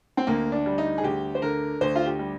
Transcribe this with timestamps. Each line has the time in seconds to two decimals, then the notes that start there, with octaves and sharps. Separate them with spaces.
0.17 C4
0.27 D2 A#3
0.52 D4
0.66 G3
0.78 D#4
0.98 G#4
1.03 D2 G4
1.35 C5
1.42 D3 A#4
1.81 D2 C5
1.95 F4
2.06 G4
2.19 G3